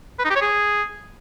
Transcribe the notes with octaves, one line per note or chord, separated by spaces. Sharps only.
B4
D#4
G4
C#5
G#4